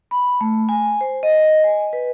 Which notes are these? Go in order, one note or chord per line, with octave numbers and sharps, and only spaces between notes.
B5
A3
G#5
C5
D#5
G#5
B4